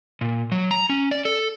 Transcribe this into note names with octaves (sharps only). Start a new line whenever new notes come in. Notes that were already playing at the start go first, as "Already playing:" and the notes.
A#2
F#3
A#5
C#4
D5
A4